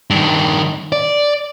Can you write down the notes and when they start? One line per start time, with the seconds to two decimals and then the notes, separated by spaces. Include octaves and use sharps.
0.10 G2 D#3
0.92 D5